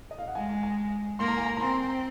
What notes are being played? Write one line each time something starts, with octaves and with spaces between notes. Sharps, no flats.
D#5
F5
F#5
G#3 G#5
G#5
G#5
A#3 C6
A#5
G#5
A#5
A#5
C4 C6